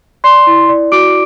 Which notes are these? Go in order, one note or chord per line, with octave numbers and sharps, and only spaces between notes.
D5 C6 C7
E4
D5
F#4 D6 D7